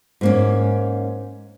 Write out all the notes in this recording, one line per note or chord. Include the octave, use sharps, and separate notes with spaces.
G#2 A#3 C#4